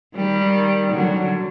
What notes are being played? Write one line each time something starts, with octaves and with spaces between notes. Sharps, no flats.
D#3 G3
D3 F#3